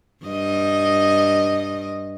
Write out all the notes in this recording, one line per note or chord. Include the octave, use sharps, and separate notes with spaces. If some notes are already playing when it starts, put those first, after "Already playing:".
G2 D#5